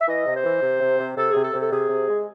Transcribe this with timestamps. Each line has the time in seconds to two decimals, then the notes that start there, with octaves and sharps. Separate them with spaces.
0.01 E5
0.08 E3 D#5
0.26 C3
0.35 C5
0.44 E3
0.62 C3
0.80 C3
0.99 C3
1.16 C3 A4
1.31 C3 G#4
1.43 A4
1.53 C3
1.60 A4
1.71 C3 G#4
1.89 C3
2.08 G#3